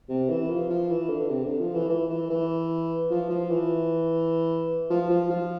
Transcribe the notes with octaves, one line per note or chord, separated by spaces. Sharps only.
C3
E3
F3
F3
E3
D3
C3
D3
F3
E3
E3
E3
E3
F3
F3
E3
F3
F3
F3